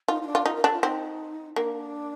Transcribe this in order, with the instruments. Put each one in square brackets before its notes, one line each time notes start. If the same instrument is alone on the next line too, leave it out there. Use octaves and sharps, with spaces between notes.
[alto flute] D#4 [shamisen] F4
[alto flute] D#4
D4
[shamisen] F4
[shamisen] D#4 [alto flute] F4
[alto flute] A#4
[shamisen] D4 [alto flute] A4
[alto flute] F4
[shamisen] C4 [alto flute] D#4
[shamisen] A#3 [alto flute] D4